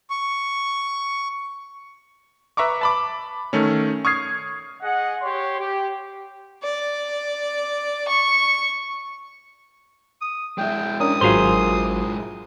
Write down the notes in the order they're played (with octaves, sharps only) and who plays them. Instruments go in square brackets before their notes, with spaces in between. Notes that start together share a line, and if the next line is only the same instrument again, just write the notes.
[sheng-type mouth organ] C#6
[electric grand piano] B4 E5 A#5 C#6 D6
A5 B5 D6
D#3 A3 C#4
C#6 D#6 F6 G#6 C7
[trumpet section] G#4 D#5 F#5
G4 C#5 C6
G4
[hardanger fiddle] D5
C#6
[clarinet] D#6
[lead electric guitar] G#3 E4 [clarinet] G5
[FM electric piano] C#4 D4 A#4 [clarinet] D#6
[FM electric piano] G#1 F#3 F4 [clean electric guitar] G#4 A#4 C5